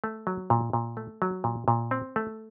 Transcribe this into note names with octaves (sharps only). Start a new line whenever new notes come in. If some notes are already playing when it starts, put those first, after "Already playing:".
A3
F#3
A#2
A#2
A3
F#3
A#2
A#2
C4
A3